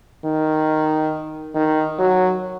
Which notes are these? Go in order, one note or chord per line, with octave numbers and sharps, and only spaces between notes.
D#3
D#3
F#3